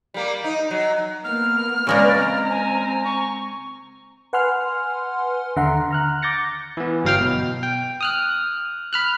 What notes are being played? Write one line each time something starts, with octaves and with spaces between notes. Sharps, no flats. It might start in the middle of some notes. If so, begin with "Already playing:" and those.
G3 A#3
D#4
F#3
A#3 B3 F6
C#3 G#3 A#3 B4 D5
C4 A#5
G#5
C#6
B4 F#5 G#5 C6 F6
D#2 D3 E5 F#5 A#5 C6
A#5 F6 F#6
D6 G6 A6 A#6 C#7
E3 B3
G1 F#3 F5 G5 F6
B2
G5
D#6 F6 F#6
B5 F6 F#6